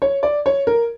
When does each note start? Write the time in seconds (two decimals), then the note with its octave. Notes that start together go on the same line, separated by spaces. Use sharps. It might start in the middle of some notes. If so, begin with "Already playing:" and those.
0.02 C#5
0.23 D5
0.46 C#5
0.67 A#4